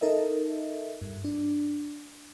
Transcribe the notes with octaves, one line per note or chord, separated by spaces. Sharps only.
D#4 A4 A#4 D#5 E5
G2
D4